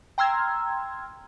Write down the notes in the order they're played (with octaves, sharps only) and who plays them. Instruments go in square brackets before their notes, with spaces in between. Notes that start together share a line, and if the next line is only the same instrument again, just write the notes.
[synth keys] G5 A#5 C6 E6 F6 G#6